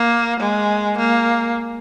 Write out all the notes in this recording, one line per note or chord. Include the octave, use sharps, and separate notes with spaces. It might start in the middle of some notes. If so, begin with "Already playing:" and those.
Already playing: A#3
G#3
A#3